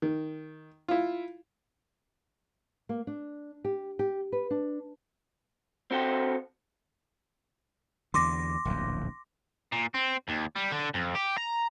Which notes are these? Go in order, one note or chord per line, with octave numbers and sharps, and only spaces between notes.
D#3
E4 F4
A#3
D4
G4
G4
B4
D4
C4 F#4 A4 G5
E2 D3 C6 D6 A#6
D1 A#1 E2
A#2
C4
D#2
G3
D3
F2
G4
A#5